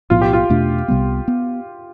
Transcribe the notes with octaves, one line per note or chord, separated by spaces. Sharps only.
B1 A2 F3 B3 F4
G4
F4
E2 B2 A3 D4
C2 C3 G3 B3
B3